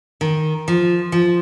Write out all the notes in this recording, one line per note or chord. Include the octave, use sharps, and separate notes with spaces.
D#3
F3
F3